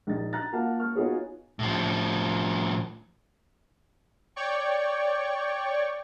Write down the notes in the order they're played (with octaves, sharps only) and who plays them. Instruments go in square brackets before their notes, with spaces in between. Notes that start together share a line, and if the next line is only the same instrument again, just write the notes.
[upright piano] A#1 D#4 A6
A#5 F#6 A6
A#3 F4 F5 F#5 A5
A#3 C#6 F6
B3 D#4 F4 F#4 G#4 C#5
[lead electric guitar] A2 F3
[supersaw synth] C#5 D5 G5 C#6